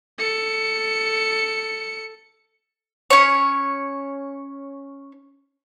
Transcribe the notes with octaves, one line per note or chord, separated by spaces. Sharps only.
A4 C#7
C#4 C#5